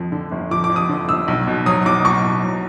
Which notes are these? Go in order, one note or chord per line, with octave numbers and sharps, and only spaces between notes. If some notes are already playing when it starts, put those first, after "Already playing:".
Already playing: F2 F3
D3
G1
F3 D6
D6
F2
D#6
D3
G1 E6
B1
B2
F#3 D#6
B1 D6
B1 C#6
B2
F#3